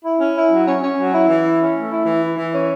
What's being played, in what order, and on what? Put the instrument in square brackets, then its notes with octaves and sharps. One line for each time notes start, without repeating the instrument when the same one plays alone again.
[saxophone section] E4
C#4
E4
F#3
C#4
C#4
F#3
E4
E3
E4
C#4
A3
E4
E3
E4
E3
C#4